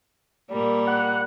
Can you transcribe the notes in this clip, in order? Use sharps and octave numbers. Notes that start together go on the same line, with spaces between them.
A#2 G3 A#3
F#5